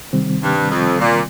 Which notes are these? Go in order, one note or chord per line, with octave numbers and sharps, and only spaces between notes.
C3 D#3 G3 C4
G2
F2
A#2